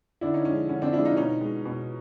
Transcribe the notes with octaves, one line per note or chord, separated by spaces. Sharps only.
D3 D4 E4
C#4 D#4
F3 G#3 C#4
D3 C#4
C4 D4
F3 G#3 D4 E4
D#4 F4
B2 C#4 D#4
G#3
B2